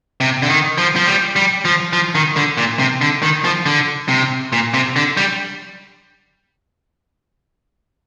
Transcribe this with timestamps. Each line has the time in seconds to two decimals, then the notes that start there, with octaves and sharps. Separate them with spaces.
0.20 C3
0.43 D3
0.49 D#3
0.78 F3
0.96 F3
1.06 G3
1.36 G3
1.65 F3
1.93 F3
2.15 D#3
2.36 D3
2.57 A#2
2.79 C3
3.01 D3
3.22 D#3
3.44 F3
3.66 D3
4.09 C3
4.52 A#2
4.74 C3
4.96 D3
5.17 G3